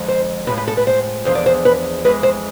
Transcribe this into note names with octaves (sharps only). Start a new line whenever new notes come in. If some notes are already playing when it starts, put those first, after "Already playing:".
Already playing: F2 D3 F3 G#3
C5
A2 F3 G#3 B4
B4
A4
B4
C5
E2 D3 F3 G#3 C5
D5
C5
B4
F2 E3 G#3 B4
C5